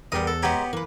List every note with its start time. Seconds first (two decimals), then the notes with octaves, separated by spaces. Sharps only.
0.12 E2 G3 B3 A#4 D#6
0.27 A4
0.43 G#3 B3 G4 C#5 A#5
0.73 E3 A#3 B4